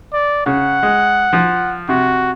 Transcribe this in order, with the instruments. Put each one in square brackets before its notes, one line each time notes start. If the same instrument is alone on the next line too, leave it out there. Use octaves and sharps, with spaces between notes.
[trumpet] D5
[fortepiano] C#3 [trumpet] F#5
[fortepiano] G#3
F3 F4
[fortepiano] C3 [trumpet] F#4